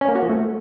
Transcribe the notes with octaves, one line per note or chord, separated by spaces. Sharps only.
C#4
A#3
F#4
F3
A3